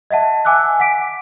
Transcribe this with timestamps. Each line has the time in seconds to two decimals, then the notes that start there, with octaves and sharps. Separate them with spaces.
0.11 D#5 E5 F#5 A5
0.45 F#5 G#5 D6 E6 F#6
0.80 F#5 D6 B6 D7